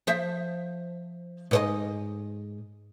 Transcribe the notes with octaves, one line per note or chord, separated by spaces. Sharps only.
F3 C5 E5
G#2 C5 D#5